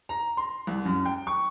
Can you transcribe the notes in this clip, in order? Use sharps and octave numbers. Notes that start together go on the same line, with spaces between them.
A#5
C6
C2
F#2
G5
C#6